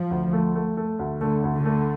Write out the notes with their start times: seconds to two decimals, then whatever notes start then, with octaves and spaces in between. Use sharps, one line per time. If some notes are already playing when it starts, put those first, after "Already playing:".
Already playing: F3
0.11 D2
0.33 A3
0.55 A3
0.77 A3
0.99 D2
1.21 D3 A3
1.44 D2
1.54 D3
1.65 A3